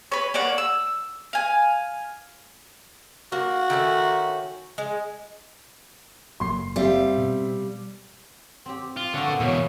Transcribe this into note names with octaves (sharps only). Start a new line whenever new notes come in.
B4 C#5
A#3 C#5 D5 F#5
E6
F5 G#5
A#3 F#4
D#3 A3 C#4
G#3
F#1 F#3 A#3 C6 C7
G3 C4 E5 F5
B2
C4 G4
F4
D3 A3 F#4
A#2 B3
E2 B2 C#5